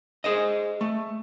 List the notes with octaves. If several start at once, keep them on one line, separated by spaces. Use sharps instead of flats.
G#4 C5 D#5
A3